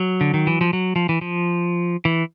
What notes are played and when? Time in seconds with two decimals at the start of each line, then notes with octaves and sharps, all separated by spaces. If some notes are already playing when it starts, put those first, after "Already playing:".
Already playing: F#3
0.21 D3
0.34 D#3
0.47 E3
0.61 F3
0.73 F#3
0.96 F3
1.09 E3
1.21 F3
2.05 E3